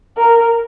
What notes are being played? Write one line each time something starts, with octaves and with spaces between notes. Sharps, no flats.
A#4